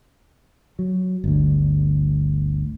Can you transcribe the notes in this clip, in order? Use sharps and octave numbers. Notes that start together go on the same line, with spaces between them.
F#3
G1 D2